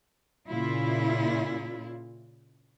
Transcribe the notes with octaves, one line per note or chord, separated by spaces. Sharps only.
A#2 C#3 E4 F4